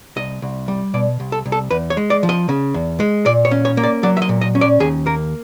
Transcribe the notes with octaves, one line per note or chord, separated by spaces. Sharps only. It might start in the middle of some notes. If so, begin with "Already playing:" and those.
C2 D#5
C2
G3
B2 D5
C2
A4
C2
A4
E2 B4
C#5
G#3
D5
F3
D#5
C#3
E2
G#3
A#2 D5
C#5
C#4
C#5
A#3
D5
F#3 D5
E5
D#5
A#2
D#5
C#4
D5
D#2 G#4
A#3 A#4